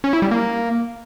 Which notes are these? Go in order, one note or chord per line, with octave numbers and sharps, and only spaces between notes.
C#4
E4
G3
A#3